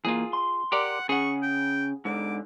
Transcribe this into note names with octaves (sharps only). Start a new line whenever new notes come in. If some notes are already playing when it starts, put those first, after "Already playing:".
E3 A#3 F4 G#4
C6
G4 A#4 D5 F#5
C#3 G#4 F#5 C#6
G5
G#2 D3 D6